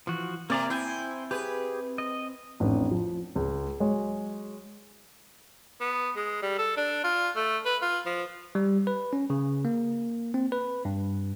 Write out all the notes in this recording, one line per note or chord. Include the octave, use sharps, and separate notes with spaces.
E3 F3 F#4
C3 A#3 C4 D5 A#5
E4 C5 G5 G#5
G4 G#4 B4
D#5
A1 F2 D4
F3
C#2
F#3 G#3 C#5
B3
G#3
G3
A4
D4
F4
A3
B4
F4
F3
G3
B4
C#4
C#3
A#3
C4
B4
G2